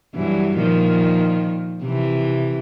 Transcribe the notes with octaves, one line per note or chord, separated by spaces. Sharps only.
G2 E3 F#3
A#2 D#3 F3
C3 E3